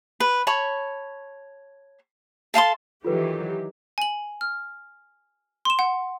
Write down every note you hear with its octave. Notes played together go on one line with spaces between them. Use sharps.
B4
C#5 A5 B5 C#6
A4 F5 A5 C6
D#3 E3 F#3 F4 G4 A4 B4
G#5 F#7
F6
C6 E7
F#5